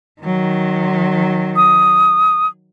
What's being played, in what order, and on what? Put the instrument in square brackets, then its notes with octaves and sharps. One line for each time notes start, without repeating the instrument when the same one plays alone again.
[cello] D#3 F#3
[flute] D#6